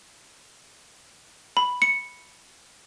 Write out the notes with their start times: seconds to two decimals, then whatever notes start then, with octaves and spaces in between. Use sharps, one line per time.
1.57 B5
1.82 C#7